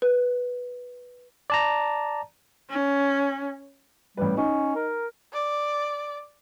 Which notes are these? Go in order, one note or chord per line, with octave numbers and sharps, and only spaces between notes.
B4
D5 A5 A#5
C#4
A1 G3 B4
C#4 D#4
A#4
D5